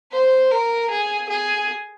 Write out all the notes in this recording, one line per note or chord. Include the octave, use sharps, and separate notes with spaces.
C5
A#4
G#4
G#4